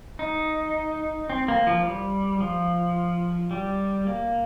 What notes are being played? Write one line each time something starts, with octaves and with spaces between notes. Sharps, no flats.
D#4
C4
A#3
F3
G3
F3
G3
A#3